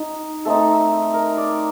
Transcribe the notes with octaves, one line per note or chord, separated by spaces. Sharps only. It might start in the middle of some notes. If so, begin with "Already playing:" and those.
Already playing: D#4
A3 C4 D#4 A4
A#4
D5